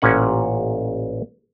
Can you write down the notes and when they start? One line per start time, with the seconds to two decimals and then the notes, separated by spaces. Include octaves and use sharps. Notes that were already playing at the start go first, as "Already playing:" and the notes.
0.02 A1 A#2 C#4 F#5